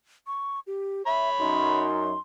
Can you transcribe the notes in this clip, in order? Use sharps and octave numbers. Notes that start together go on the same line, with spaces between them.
C#6
G4
C#5 E5 B5
F#2 D#4 C6